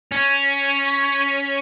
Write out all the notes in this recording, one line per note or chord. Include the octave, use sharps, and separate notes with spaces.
C#4